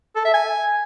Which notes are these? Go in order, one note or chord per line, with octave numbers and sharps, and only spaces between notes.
A4
E5
G#5